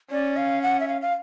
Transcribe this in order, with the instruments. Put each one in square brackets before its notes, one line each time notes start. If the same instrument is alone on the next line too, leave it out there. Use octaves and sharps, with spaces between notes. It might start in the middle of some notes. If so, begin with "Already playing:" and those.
[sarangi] C#4 [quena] D5
[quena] F5
F#5
E5
F5
F5